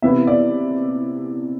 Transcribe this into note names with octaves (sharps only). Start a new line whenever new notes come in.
C3 E3 B3 E4 E5
D5